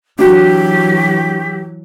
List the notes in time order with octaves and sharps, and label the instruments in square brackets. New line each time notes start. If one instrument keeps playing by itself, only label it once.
[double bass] E3 F#3 [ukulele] D4 F#4 [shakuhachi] G4